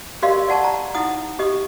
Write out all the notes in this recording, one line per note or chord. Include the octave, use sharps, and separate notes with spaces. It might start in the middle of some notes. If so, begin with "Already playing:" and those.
G4 A#4 D5 D#5 F5 C6
D5 F#5 A5 C#6
A#5
D#4 E4 F#5 D#6
G4 D#5 D#6